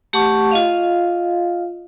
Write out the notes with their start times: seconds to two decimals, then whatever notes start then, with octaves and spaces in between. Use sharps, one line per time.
0.13 A3 G4 F#5 A5 C#6 D6
0.51 F4 D#5 F5